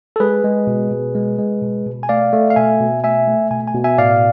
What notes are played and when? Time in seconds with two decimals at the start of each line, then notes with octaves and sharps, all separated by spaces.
0.16 A4
0.20 G#3 G#4 B4
0.44 G#3
0.67 B2
0.91 B2
1.15 G#3
1.39 G#3
1.62 B2
1.86 B2
2.03 G#5
2.09 A3 D5 F5
2.33 A3
2.50 F5
2.56 B2 E5 G#5
2.80 B2
3.04 A3 E5 G#5
3.27 A3
3.51 B2 G#5
3.68 G#5
3.75 B2
3.84 E5 G#5
3.98 A2 D5 F5